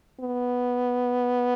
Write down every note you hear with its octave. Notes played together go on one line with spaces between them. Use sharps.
B3